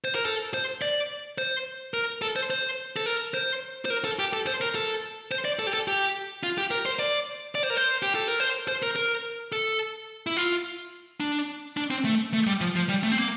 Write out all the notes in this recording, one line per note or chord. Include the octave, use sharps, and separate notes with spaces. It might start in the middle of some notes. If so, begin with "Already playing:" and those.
C5
A#4
A4
C5
D5
C5
A#4
A4
C5
C5
A4
A#4
C5
C5
A#4
A4
G4
A4
C5
A#4
A4
C5
D5
A4
G4
A4
G4
F4
G4
A#4
C5
D5
D5
C5
A#4
C5
G4
A4
A#4
C5
C5
A#4
A#4
A4
E4
F4
D4
D4
C4
A3
A3
G3
F3
F3
G3
A3
C4
A#3